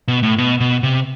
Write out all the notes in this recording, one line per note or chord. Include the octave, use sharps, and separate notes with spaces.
B2
A2
B2
B2
C3